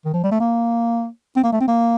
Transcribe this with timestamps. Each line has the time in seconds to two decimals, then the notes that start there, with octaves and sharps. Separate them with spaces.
0.05 D#3
0.14 F3
0.24 G3
0.31 A3
0.40 A#3
1.36 C4
1.43 A#3
1.52 A3
1.60 C4
1.68 A#3